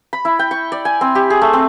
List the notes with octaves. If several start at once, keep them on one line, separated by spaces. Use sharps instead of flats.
B5
E4
G5
C#6
D5
G#5
C4
G4
G#4
A3
C4